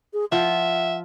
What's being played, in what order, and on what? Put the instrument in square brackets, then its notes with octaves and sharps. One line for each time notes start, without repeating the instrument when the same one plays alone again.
[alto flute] G#4
[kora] F3 F4 [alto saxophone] E5 [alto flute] F#5